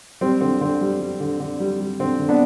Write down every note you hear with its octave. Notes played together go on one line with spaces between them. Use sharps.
G3 C4
D3 C4
D3 C4
G3
G3
D3
D3
G3
G3
D3 C4
D3
B3 D4